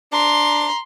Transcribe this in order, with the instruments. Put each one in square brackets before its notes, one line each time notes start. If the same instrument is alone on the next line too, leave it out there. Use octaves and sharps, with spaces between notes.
[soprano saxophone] D4 [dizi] A#5 [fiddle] C6